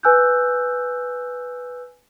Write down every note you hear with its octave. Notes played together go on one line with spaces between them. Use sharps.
B4 G#5 E6 F#6 G6